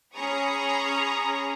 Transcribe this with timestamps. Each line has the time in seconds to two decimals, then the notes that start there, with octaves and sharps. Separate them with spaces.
0.14 C#4 G#4 A#5 B5 C#6 D#6